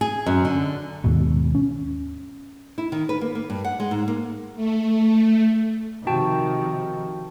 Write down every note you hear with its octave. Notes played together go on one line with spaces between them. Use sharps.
G#4
F#2
D3
D#2 G#2 B2
C#4
E4
D#3
B4
A#3
A#3
G2
F#5
G#3
G#2
A#3
A3
C3 D#3 F3 F#4 G5 A5